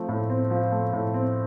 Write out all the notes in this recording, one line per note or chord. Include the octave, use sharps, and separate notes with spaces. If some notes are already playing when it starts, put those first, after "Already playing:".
Already playing: F3 A3 C4
A2
C4
F3
A3
A2
C4